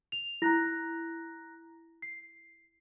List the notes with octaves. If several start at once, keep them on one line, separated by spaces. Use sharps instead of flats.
F7
E4 A#5 F#6 A#6
C7